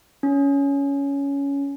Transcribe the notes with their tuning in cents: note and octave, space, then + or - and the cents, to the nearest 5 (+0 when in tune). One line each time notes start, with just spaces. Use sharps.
C#4 +15